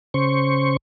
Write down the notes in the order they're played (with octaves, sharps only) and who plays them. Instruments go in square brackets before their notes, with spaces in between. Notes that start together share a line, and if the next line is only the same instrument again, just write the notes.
[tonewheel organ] C#3 C5 C#6